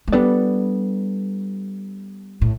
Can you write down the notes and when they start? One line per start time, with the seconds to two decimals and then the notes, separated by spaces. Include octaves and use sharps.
0.08 A3
0.13 G3 B3 D4 A4 D5
2.41 A2